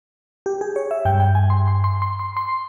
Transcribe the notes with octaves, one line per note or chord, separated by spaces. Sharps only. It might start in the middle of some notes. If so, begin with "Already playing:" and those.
G4
G#4
C#5
E5
G2 G3 G5
G5
G#5
C6
C6
C6
C6
C6
C6